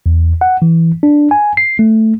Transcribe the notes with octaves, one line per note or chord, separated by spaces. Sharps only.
E2
F#5
E3
D4
G#5
C7
A3